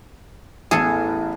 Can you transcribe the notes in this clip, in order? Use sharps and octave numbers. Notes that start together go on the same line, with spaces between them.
A1 E2 G#4 A4